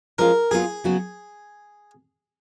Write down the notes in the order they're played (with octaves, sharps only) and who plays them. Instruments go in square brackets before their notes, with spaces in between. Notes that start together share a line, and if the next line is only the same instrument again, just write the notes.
[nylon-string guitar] F3 G#3 C#4 F4 [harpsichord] A#4
[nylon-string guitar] F#3 B3 F4 [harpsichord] G#4
[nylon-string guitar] C#3 F#3 B3 F#4